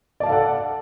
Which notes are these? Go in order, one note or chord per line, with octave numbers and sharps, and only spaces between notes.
A4 D5 F5 F#5 A5